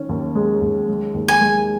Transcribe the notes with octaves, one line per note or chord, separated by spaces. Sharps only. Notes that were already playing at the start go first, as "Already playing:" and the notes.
Already playing: D#3 C#4
D#2
G#3
D#2
G#3
D#2
G#5
G#3